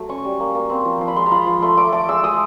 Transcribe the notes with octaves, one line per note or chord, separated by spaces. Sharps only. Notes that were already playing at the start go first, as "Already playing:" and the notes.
Already playing: F#3 A3
C#4 C#6
G3
A#3
A#3
C4
F3
F3
B5
G#3 C6
A#5
F4 B5
F3
A3 C6
A3 D6
A3 D6
G#3 E6
G#3 D#6